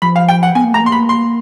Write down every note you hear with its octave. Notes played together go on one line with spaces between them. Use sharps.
F3 B5
F5
G5
F#5
B3 G#5
A#3
A3 A#5
A#3 C6
B5
C6